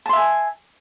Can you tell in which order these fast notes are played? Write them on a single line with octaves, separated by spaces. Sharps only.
A5 C6 E5 G#5